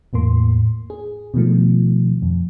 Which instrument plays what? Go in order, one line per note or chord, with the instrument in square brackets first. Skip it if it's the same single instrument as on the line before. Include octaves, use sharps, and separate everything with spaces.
[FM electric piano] E2 A2 A#3 C6
G#4
B2 D#3 F3 A3
F2